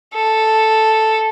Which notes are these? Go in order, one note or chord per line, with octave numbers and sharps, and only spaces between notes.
A4